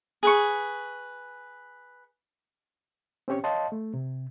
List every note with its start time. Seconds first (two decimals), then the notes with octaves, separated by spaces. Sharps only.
0.23 G#4 B4 C#6
3.28 C4 C#4 G4 C#5 C#6
3.44 C#5 D#5 F5 A5 C6
3.72 A3
3.94 C3